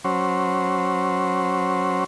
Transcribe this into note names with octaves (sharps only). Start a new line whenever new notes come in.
F#3 C#4 C5